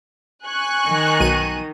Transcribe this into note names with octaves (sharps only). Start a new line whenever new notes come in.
G#5 C#6 F#6
D#3
B1 D#7